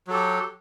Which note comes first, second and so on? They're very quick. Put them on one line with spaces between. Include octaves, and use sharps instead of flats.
F#3 A4 G4